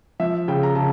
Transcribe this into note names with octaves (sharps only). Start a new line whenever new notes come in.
F3 E5
C#3 G5
A#5
C#3 A5